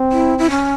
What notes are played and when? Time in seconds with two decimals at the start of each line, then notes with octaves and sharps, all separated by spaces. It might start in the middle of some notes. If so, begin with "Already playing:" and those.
Already playing: C4
0.12 E4
0.39 E4
0.50 C#4